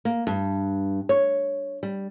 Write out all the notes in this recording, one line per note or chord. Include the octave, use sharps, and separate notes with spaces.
A#3
G2
C#5
G3